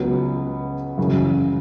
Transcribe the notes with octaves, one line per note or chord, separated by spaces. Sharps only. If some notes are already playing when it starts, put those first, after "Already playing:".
Already playing: C#2 C#3 F#3 B3 F#4
F#2 C#3 E3